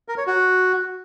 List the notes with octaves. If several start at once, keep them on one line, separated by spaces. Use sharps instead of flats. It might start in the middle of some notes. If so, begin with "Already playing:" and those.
A#4
C#5
F#4